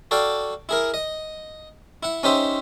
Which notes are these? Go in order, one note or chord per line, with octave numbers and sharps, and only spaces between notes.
F#4 A4 D5 F5 G5
E4 G#4 A#4
D#5
E4 F#5
C#4 D#4 G4 C5 E5